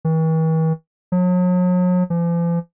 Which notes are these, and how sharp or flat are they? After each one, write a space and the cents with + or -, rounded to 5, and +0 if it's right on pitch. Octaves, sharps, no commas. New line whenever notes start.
E3 -45
F#3 -40
F3 -45